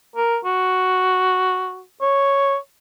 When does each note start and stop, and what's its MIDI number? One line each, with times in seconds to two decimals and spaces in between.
0.16 0.38 70
0.45 1.83 66
2.02 2.57 73